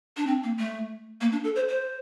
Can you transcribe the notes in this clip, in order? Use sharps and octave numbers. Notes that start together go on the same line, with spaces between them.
D4
C4
A#3
A3
A#3
D4
A4
C5
C5